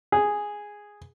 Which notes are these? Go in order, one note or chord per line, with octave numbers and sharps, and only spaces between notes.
G#4